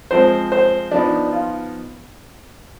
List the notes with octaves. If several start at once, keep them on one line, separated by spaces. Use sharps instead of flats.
F3 G#3 C4 C5
C5
F3 B3 D4 D#4
F4